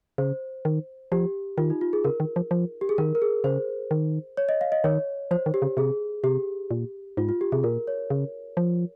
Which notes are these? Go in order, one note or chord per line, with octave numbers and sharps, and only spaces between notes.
C#3 C5
D#3
F3 G4
D#3 F4
D#4
F4
G#4
C#3 A#4
D#3
F3
F3
G4
G#4
D#3 A#4
A#4
G#4
C#3 C5
D#3
C#5
D#5
F5
D#5
D#3 C#5
F3 C5
D#3
G4
C#3
C3 G#4
C3 G4
A#2
G#2 F4
F4
G4
C3 G#4
A#2 A#4
C#5
C#3
F3